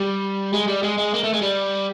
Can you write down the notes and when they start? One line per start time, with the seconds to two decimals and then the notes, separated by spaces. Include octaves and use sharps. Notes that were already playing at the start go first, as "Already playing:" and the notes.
Already playing: G3
0.54 G#3
0.68 G3
0.83 G#3
0.98 G#3
1.14 A#3
1.24 A3
1.33 G#3
1.42 G3